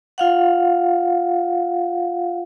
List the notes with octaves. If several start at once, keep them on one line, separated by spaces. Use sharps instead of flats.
F4 F5 F#5